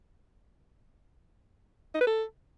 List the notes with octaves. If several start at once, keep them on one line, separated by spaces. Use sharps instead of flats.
D#4
B4
A4